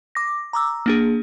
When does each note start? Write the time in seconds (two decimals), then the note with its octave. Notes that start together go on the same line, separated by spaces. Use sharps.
0.15 D6 A#6
0.53 A#5 D6 E6
0.86 A#3 D4 G#4